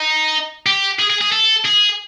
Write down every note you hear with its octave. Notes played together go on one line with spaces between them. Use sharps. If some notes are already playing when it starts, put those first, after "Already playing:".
Already playing: D#4
G4
G#4
G#4
G#4
A4
G#4